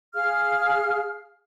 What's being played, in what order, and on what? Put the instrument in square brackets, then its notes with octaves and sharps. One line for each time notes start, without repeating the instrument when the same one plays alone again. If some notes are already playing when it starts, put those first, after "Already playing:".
[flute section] G#4 F5 F6